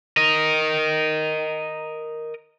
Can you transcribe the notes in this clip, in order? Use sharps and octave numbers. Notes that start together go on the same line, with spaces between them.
A#4 D#5